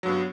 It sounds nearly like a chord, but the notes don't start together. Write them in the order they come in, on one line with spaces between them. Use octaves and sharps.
F#3 G2 B3